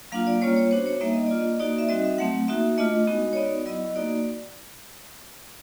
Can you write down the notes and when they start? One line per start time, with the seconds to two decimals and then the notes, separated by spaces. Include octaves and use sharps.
0.12 F#3 A#3 D4 F4 F5
0.27 D5
0.42 G3 A#3 C#4 F4 C#5
0.56 C#5
0.71 B3 D4 F#4 C5
0.86 C#5
1.00 G3 A#3 D#4 E5
1.13 D#5
1.27 A#3 D4 F4 D5
1.39 D#5
1.60 A#3 D#4 F#4 D5
1.78 E5
1.89 G3 C4 D#4 F#4 D#5
2.04 E5
2.18 F#3 A3 C4 F#5
2.48 A#3 D#4 F#4 E5
2.78 A3 D4 F4 D#5
3.07 G#3 B3 D#4 F#4
3.33 C#5
3.36 B3 D#4 F#4 D5
3.66 F#3 B3 E4 D#5
3.95 A#3 D#4 F#4 D5